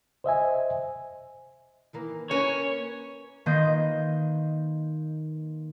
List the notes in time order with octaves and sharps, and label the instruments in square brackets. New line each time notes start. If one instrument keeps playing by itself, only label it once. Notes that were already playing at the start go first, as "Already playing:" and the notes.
[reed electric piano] C5 D#5 E5 G#5
[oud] D#3 E3 A#3
[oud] A#3 A#4 B4 [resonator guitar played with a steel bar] C#4 [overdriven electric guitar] C#5
[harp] D#3 A#3 B4 D#5 C6 G6